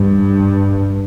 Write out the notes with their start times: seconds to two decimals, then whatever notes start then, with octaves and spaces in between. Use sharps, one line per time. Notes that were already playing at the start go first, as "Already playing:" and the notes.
Already playing: G2